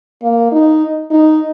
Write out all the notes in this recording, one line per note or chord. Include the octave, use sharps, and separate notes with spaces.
A#3
D#4
D#4